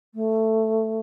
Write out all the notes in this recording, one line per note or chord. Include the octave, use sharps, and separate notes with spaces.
A3